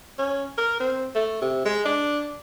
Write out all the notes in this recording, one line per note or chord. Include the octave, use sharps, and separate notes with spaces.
C#4
A#4
C4
A3
C3
G#3
D4